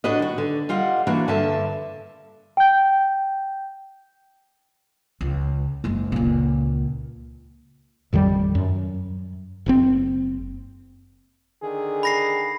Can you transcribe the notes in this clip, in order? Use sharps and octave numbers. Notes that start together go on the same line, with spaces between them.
A2 D4 F#4 B4 D#5
D#3 F#4
D3
G3 F4 D#5 F#5
E3 A#3 D4 F#4
G2 D3 A#4 E5 A5
G5 G6
C#2
F#1 G#3
C#2 A#2
A1 F2 D#3 G3
F#2
F#1 C#3 C4
D3 D#3 G#4
B5 A#6 C7